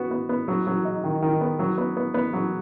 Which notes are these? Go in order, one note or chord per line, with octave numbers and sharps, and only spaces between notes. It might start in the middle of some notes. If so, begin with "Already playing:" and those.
Already playing: B3 F#4
B3
B3
F#3
F#3
D#4
D#3
D#3
B3
F#3
B3
B3
B3
F#3